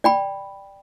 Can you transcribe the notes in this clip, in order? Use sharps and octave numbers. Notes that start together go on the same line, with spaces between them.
D5 G5 B5